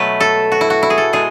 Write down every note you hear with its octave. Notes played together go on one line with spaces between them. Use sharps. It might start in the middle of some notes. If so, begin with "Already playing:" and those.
Already playing: B2 F#3 A3 B4
A4
F#4
E4
F#4
E4
G#4
A4
B2 G#3 G#4